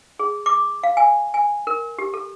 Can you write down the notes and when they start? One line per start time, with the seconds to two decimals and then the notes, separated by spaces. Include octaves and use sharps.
0.19 G#4
0.46 D6
0.83 F5
0.97 G#5
1.34 G#5
1.67 A#4
1.98 G4
2.14 A4